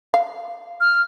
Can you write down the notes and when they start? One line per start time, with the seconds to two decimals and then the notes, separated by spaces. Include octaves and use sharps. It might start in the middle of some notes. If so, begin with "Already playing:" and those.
0.14 F5
0.80 F6